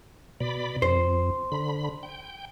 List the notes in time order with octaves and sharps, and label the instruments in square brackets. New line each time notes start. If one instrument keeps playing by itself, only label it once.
[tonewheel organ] B2 D5 B5
[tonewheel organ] F2 [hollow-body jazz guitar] C5
[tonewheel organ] D3 B5
G5